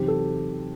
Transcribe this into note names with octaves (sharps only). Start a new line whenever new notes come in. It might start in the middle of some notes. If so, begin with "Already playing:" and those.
Already playing: E2 C3 F#3 C4 D#4 G4
A4